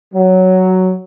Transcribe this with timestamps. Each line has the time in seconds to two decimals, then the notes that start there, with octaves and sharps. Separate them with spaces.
0.14 F#3